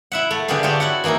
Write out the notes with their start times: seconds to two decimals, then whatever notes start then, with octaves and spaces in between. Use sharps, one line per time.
0.12 E4 E5 F#5
0.31 A3
0.48 D3 B3 G4 G#4 F5
0.63 D4 F4 G4 C#5 E5
0.80 E4 F#4 F#5
1.04 E3 A#3 D#4 E4 A#4